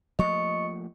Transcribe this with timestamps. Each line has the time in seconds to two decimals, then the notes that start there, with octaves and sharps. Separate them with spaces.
0.19 F3 A3 A#3 D#5 C#6 C#7